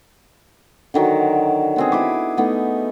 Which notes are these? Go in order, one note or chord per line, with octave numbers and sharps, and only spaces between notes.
D3 D#3 F#3
B3 C4 G#4
E4 B5 D6
A3 B3 D#4